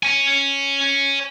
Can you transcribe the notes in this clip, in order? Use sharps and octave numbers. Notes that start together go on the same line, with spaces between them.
C#5 G#5